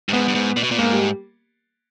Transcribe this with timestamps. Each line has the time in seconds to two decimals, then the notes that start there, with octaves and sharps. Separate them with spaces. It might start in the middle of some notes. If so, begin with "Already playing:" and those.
0.09 G2
0.13 G#2 B3
0.28 G2
0.35 G#2
0.57 A#2
0.63 B2
0.71 A#2
0.78 G#2 A#3
0.93 G3